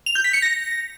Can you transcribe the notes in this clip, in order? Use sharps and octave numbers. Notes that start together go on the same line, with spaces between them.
F7
G6
B6
C#7
A#6